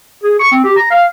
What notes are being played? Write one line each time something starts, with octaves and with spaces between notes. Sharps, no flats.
G#4
C#6
C4
G4
A#5
F5